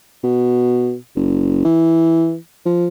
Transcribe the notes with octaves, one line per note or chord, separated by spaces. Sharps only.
B2
F#1
E3
F3